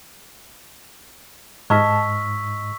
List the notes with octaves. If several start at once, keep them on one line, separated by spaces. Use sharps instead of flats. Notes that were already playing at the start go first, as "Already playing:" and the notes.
G#2 D#5 A5 C#6 E6 F6 G#6 B6